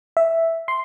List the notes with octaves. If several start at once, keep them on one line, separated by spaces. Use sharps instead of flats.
E5
C6